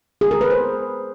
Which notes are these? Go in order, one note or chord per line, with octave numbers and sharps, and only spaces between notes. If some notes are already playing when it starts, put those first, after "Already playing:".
G#4
A#4
B4
C5